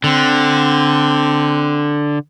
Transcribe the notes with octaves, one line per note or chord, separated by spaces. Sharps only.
D3 C4